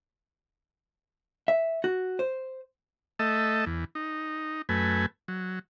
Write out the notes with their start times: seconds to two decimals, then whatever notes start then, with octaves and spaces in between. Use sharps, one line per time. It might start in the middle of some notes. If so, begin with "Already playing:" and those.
1.48 E5
1.84 F#4
2.19 C5
3.19 A3 A4 D#5 E5
3.66 E2
3.95 D#4
4.69 F#2 A3 B4 G#5
5.28 F#3